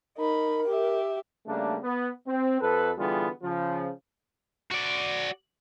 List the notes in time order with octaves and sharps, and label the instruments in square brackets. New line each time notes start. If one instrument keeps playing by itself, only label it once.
[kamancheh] D#4 B5 [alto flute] A#4
[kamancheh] G4 E5
[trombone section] C#3 G3 A3 A#3 D4
B3
C4
F2 A4 B4
D3 E3 G3 B3 F4 G#4
C#3 F3
[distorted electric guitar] F#4 D5